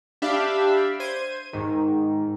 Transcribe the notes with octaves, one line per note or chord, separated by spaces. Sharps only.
D4 G4 E5 F5 B5
C5 G#6 D#7
G#2 D#3